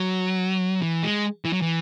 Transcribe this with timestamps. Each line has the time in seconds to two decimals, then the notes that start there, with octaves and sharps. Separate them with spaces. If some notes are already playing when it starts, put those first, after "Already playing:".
Already playing: F#3
0.82 E3
1.03 G#3
1.45 E3
1.53 F#3
1.61 E3